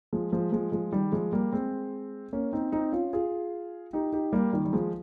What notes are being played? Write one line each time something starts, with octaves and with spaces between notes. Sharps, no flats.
F3 G#3
F3 G#3
F3 G#3
F3 G#3
D#3 G3
F3 G#3
G3 A#3
G#3 C4
A#3 C#4
C4 D#4
C4 D#4
C#4 F4
F4 G#4
D#4 G4
D#4 G4
G3 A#3
D#3 G3
G3
F3 G#3